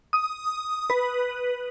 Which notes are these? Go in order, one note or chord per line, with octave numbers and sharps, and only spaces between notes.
D#6
B4